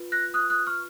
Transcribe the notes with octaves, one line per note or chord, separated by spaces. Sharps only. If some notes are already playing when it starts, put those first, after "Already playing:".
Already playing: F4 B4
F#6 A#6
D#6 F#6
D#6 F#6
C#6 F6